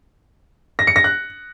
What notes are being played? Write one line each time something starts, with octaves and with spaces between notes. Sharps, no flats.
A#6
C#7
A#6
F#6